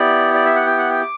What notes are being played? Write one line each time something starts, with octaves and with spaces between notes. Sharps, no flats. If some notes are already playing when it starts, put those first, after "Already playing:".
Already playing: B3 E4 G4 D5
D5
E5
F#5
G5
F#5
G5
D6